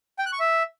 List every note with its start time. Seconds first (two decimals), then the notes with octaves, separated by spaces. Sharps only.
0.19 G5
0.26 F#6
0.33 C#6
0.40 E5